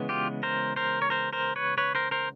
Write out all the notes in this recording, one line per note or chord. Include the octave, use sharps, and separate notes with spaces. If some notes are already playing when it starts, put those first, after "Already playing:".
Already playing: C#3 E3 G#3 B3
F4 G4
A#4 C5
A#4 C5
C#5
A#4 C5
A#4 C5
B4 C#5
B4 C#5
A#4 C5
A#4 C5